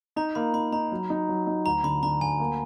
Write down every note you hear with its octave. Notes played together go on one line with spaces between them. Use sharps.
D#4 A#5
A#3 B5
D#4 B5
D#4 A#5
F#3
D#4
F#3
D#4
D2 A#5
D3 B5
D3 A#5
D2 G#5
A#3